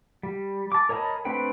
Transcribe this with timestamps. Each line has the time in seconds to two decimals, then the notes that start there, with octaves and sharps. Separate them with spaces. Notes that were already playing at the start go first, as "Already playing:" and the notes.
0.23 G3
0.72 A5 D6
0.89 A#4 C#5 D#5 A5 B5
1.25 A3 C4 D4 B4 G5